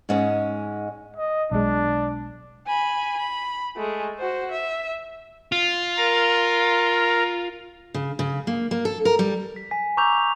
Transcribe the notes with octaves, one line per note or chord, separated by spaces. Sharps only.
G#2 G#3 C#4
D#5
B1 G#3 D4
G#5 B5
B5
G#3 A3
F#4 C5
E5
F4
A#4
C#3
C#3
A#3
A#3
A4
A#4
G3
B6
G#5 B6
A#5 C#6 D6 E6 G6 F7
G#5